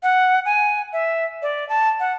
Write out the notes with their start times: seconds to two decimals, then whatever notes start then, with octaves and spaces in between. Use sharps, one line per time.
0.03 F#5
0.46 G#5
0.93 E5
1.42 D5
1.69 A5
2.00 F#5